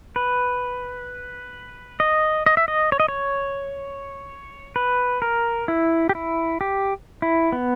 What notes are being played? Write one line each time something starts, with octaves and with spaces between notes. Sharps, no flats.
B4
D#5
D#5
E5
D#5
C#5
D#5
C#5
B4
A#4
E4
G4
E4
G4
E4
B3